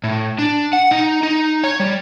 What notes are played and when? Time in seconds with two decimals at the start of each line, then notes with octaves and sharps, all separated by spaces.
0.04 A2
0.39 D4
0.73 F#5
0.91 D#4
1.23 D#4
1.64 C#5
1.80 G3